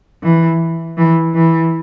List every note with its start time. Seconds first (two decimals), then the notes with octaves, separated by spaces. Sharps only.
0.23 E3
0.97 E3
1.34 E3